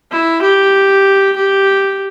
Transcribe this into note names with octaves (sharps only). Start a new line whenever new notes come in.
E4
G4
G4